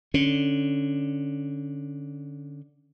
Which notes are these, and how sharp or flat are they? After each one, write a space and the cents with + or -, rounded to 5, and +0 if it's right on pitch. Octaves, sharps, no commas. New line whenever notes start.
D3 +0 C#4 +0